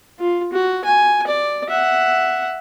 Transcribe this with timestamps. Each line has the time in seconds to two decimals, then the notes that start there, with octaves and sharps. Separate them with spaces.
0.19 F4
0.53 F#4
0.84 G#5
1.27 D5
1.69 E5 F#5